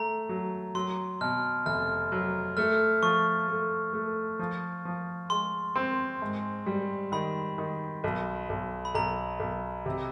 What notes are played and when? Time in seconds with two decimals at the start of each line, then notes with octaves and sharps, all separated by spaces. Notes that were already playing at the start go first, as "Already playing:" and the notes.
Already playing: A3 A#5
0.29 F#3
0.75 F#3 C6
1.21 B2 F6
1.66 F1 F6
2.12 F#3
2.57 A3 F6
3.03 F3 C#6
3.48 A3
3.93 A3
4.39 F3
4.85 F3
5.30 G#3 C6
5.76 C4
6.22 G#2
6.66 G3
7.12 D#3 B5
7.58 D#3
8.04 B1
8.49 B1
8.85 B5
8.95 B1 A#5
9.40 B1
9.86 C3